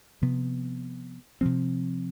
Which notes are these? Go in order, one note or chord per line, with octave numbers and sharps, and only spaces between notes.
C3 F3 B3
C3 F3 C4